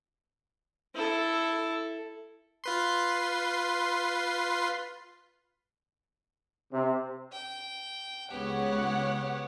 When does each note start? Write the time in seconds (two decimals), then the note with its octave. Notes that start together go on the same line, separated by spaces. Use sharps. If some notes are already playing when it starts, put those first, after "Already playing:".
0.94 E4 A4
2.64 F4 B4 C6
6.73 C3
7.32 G5
8.30 C#2 C#3 B3 G4 C#5 F#5